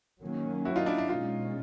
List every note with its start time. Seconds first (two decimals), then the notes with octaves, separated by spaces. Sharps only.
0.21 D#3 F#3 A#3 C#4
0.65 E4 F#4
0.76 D#4 F4
0.86 D4 E4
0.98 D4 E4
1.08 B2 G#3 C#4 D#4 F4